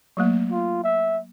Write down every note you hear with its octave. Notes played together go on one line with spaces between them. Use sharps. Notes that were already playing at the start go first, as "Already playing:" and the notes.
F#3 A3 A#3
F4
E5